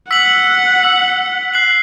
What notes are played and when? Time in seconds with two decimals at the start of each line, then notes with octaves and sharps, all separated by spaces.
0.11 F#5 E6 B6 F#7
0.82 E6 B6 F#7
1.54 F#6 C7 F#7